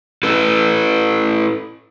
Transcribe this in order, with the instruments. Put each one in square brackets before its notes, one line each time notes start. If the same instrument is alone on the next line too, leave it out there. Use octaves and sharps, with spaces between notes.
[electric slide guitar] E4 A4 B4